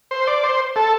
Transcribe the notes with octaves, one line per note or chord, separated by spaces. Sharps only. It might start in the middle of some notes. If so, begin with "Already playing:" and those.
C5
D5
C5
A4